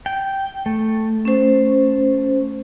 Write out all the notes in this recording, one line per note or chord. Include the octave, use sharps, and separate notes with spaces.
G5
A3
C#4 C5